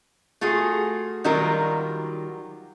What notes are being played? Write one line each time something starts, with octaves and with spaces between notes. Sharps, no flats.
A3 F4 F#4 G#4
D#3 F#3 G3 F4 F#4 A#4